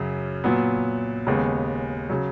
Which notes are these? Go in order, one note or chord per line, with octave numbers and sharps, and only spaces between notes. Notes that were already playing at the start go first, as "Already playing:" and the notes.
Already playing: F#2 C#3 F#3
A#2 F#3 B3
D#2 C#3 G#3 B3
C#3 F#3